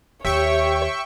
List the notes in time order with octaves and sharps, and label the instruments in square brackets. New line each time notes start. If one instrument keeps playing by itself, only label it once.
[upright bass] D#2 [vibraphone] G4 [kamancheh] C#5 [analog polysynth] E5 G5 C#6